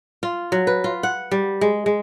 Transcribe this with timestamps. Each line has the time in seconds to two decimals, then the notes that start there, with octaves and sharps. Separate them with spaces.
0.23 F4
0.52 F#3
0.67 B4
0.84 F4
1.03 F#5
1.31 G3
1.61 G#3
1.86 G#3